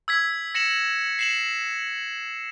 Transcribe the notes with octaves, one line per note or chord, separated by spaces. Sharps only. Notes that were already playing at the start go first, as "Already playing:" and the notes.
E6 G#6 B6
A#6 C#7 E7 F#7
C7 E7 F#7